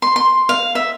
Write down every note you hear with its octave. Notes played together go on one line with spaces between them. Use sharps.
C6
C6
F5
E5